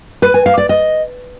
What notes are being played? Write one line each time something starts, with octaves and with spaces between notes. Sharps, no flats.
B4
G#5
F5
D5
D#5